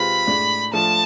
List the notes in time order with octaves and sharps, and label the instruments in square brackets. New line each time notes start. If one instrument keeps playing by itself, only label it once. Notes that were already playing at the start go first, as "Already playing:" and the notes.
Already playing: [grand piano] C3 G#3 C4 F4 B4 [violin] B5
[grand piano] A2 G#3 D4
[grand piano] F3 A3 D4 F4 [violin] A5